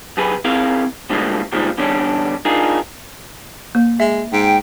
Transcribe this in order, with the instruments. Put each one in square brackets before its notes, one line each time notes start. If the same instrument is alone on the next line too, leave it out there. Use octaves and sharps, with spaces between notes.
[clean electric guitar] F#2 G4 G#4 B4
C4 E4 G#4 A#4 F5
A2 D3 F3 G3 G#3 A#3
A#2 D#3 F3 G3 G#3
E2 D3 G3 C#4 D4
D4 D#4 F4 G#4 A#4
[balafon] A#3
[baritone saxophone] G#3 [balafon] E5
[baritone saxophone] G#2 [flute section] G5